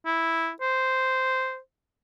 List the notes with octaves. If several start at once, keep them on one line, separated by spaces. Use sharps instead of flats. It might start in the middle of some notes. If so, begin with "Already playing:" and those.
E4
C5